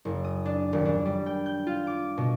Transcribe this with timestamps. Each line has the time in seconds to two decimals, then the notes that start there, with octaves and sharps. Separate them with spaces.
0.05 F#1
0.24 D#6
0.46 D4
0.73 D#1
0.85 D4
1.05 G3
1.26 G5
1.46 G6
1.67 F4
1.87 D6
2.18 B2